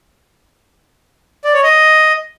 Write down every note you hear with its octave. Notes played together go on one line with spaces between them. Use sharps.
D5
C#5
D#5